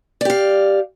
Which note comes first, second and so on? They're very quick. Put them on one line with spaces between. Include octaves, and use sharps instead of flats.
D5 G4 F5